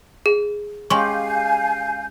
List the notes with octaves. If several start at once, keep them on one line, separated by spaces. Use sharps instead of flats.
G#4
G#3 C#4 G4 F5 G#5 C6 C#6 G6